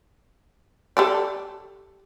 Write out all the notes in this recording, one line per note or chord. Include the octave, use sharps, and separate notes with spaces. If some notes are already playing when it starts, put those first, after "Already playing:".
G4 A4 D5